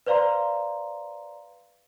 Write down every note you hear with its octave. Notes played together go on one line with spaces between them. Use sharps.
B4 C5 D5 F5 A#5 C6